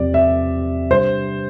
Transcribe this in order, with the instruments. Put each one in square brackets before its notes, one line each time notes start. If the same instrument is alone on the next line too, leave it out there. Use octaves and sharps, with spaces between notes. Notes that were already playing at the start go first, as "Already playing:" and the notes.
Already playing: [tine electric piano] E2 C3 F3 C4 G4 [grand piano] D5
[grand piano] E5
[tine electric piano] C3 G3 D4 G4 [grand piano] C5